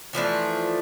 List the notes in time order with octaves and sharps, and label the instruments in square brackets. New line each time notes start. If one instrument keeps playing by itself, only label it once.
[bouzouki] E3 F3 A3 D4